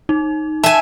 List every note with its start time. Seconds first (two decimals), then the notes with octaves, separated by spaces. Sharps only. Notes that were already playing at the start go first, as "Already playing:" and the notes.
0.09 D#4
0.64 E5 G#5 A5 E7